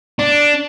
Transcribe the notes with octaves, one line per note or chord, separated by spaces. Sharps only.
D4